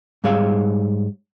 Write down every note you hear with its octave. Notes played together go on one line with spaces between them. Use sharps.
G#2 G3 G#4 C#5 F5